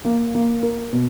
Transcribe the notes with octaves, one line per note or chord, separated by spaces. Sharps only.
A#3
A#3
A#4
B2